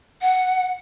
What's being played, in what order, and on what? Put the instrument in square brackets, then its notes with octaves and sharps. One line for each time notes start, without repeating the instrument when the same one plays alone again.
[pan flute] F#5